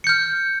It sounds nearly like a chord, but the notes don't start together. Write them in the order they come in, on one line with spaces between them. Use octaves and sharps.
C#7 G6 F6